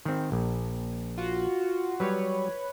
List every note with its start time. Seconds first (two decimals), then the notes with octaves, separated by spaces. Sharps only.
0.05 D#3 C4
0.32 A#1
1.18 F4 F#4
2.00 F#3 G3 B4 C#5